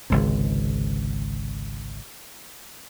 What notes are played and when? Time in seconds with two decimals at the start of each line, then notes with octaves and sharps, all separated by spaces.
0.10 G#1 C#2 C3